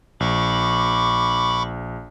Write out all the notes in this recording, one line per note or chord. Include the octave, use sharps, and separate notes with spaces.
A#1 B5 C#6 D6